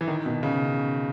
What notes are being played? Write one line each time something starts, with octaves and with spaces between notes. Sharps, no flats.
E3
D#3
B2
C#3